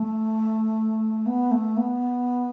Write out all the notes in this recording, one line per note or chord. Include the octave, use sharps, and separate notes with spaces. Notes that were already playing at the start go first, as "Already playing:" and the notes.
Already playing: A3
B3
A3
B3